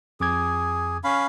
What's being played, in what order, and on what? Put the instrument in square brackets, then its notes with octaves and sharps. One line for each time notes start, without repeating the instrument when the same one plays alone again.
[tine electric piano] F2 D6 G#6 [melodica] G#4
[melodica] C#4 F5 B5